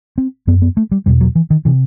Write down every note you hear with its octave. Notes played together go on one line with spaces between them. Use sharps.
C4
F#2 B3
B3
A3
G3
E2 B2 G3
F#3
E3
D#3
C3 E3